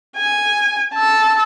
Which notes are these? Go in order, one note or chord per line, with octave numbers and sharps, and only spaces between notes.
G#5
A5 E6